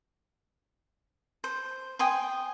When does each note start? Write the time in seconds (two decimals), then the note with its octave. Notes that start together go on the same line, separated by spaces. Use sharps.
1.44 C5
1.99 G5 G#5 C6 D#6